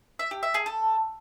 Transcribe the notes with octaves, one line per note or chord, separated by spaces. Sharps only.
E5
G4
E5
G#4
A4